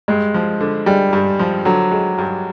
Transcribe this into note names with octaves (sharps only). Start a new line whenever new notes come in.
G2 G#3
F3
D3
G3 G#3
G2
F3
D3 F#3
G#3
G2